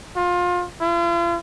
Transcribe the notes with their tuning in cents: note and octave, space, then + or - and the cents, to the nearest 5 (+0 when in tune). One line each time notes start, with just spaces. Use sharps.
F4 +25
F4 -40